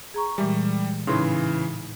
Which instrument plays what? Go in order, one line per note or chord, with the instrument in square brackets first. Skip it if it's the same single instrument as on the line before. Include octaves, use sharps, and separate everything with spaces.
[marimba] G#4 A#5 C#6
[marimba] A#2 E3 G#3 [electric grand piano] G3
[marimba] A2 D#4 C6 [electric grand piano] C#3 E3